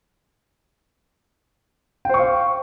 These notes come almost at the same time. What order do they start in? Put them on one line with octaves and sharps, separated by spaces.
G5 C5 C#6 F5